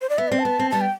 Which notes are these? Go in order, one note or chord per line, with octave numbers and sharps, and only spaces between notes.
C5
D5
B3 E5
C4 D5
A5
B3
C4
G3 B3 A5
G5